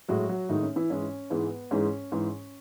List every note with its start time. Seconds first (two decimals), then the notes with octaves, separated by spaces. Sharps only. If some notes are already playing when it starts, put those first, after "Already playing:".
0.08 A2 F#3 G#3 F#4
0.29 F#3 F#4
0.49 A2 D#3 G#3 D#4
0.63 C#4
0.76 E3 E4
0.90 G#2 E3 G#3 C#4
1.30 G#2 E3 G#3 B3
1.71 G#2 E3 G#3 C#4
2.12 G#2 E3 G#3